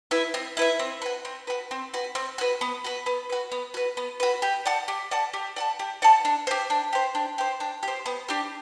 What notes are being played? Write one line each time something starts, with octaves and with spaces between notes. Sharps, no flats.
E4 B4 E5
C4
E4 B4 E5
C4
F#4 B4
C4
F#4 B4
C4
F#4 B4
C4
F#4 B4
B3
F#4 B4
B3
F#4 B4
B3
F#4 B4
B3
F#4 B4
G4
D5 F#5 A5
G4
D5 F#5 A5
G4
D5 F#5 A5
G4
D5 F#5 A5
D4
G4 C5
D4
G4 C5
D4
G4 C5
D4
G4 C5
B3
D4 G4